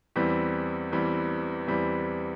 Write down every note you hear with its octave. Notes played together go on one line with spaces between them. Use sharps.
E2 E3 G3 C4
E2 E3 G3 C4
E2 E3 G3 C4